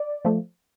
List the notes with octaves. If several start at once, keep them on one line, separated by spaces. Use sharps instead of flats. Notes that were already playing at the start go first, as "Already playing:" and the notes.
Already playing: D5
F3 A3